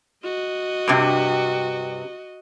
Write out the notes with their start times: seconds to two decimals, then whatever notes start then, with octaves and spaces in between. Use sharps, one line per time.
0.24 F#4 D#5
0.88 G2 C3